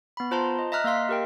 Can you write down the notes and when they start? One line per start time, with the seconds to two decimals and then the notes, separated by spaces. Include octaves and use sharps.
0.17 B3 B5
0.31 F4 C5 A5 A#5 C6
0.59 D#5
0.72 D#5 E5 A#5 F6 F#6
0.84 A#3 D#5 F5 C6 B6
1.09 G4 A#4 G5